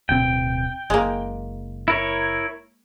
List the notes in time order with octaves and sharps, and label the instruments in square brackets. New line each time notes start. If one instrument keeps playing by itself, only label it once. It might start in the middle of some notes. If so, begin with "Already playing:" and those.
[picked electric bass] D1 B2 C4 [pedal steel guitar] G5
[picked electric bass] F#1 [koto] G#3 A#3
[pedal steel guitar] E4 A#4 C#5